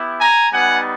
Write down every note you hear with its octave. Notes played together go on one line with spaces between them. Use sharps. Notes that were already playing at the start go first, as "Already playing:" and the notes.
Already playing: B3 E4 G4
G#5 A#5
G3 B3 D#4 F#5 G#5